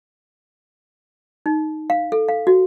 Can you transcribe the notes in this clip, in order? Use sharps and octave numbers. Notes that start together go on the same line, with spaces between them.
D#4
F5
A4
F5
F#4